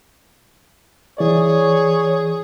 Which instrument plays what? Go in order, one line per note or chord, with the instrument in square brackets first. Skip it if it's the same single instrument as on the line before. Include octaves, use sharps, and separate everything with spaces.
[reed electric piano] E3 D5 [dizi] G#4 [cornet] C#5